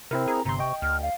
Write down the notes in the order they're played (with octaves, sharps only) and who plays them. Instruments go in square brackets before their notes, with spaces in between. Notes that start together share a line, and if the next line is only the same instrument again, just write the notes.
[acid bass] C3 [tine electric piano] C4 E4 A#4
[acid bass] G#4 [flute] A#5
[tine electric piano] G1 C6 [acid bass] C3 [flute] A#5
[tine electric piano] D#5 G5 [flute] C#6
[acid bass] D2 [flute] F6
[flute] F5